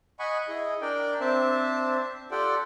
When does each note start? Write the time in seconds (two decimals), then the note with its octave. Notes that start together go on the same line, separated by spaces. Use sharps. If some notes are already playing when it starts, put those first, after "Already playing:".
0.19 D#5 F#5 G#5 B5 C#6
0.48 E4 G#4 D#5
0.82 D4 A#4 D5 G5
1.20 C4 D4 C5 E5 A5
2.31 F4 G4 A4 D5 F#5 G5